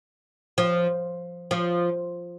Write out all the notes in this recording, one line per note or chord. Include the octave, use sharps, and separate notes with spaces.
F3
F3